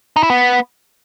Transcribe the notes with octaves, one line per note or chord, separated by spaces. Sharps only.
D#4
E4
B3